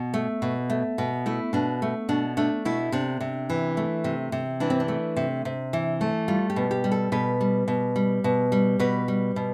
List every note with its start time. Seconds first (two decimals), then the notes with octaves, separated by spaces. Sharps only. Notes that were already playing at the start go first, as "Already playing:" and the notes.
Already playing: B2
0.14 A3
0.42 B2
0.70 A3
0.98 B2
1.26 A3 E4
1.53 B2 D4
1.82 A3
2.09 B2 D4
2.37 A3 D4
2.65 B2 E4
2.92 C3 D4
3.21 C3
3.50 E3
3.77 A3
4.04 C3
4.32 C3
4.60 E3 D4
4.70 C4
4.80 D4
4.88 A3
5.17 C3
5.45 C3
5.73 E3
6.01 A3
6.28 G3 F4
6.50 G4
6.56 B2
6.71 G4
6.84 G3
6.92 A4
7.12 B2 B4
7.41 G3
7.68 B2
7.96 G3
8.24 B2
8.52 G3
8.79 B2 B4
9.08 G3
9.36 B2